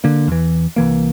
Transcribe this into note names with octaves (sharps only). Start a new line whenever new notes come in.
D3 A#3
E2 E3
C2 E3 A#3